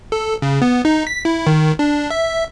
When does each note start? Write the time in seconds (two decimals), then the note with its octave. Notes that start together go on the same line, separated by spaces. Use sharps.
0.12 A4
0.42 C#3
0.62 B3
0.85 D#4
1.07 B6
1.25 E4
1.47 D#3
1.79 D4
2.11 E5